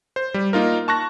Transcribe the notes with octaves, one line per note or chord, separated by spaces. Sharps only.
C5
G3
A#3 D#4 F4 A#4
A5 C#6 F#6 A#6